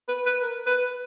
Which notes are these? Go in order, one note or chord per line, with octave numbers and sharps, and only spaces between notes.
B4
B4
A#4
B4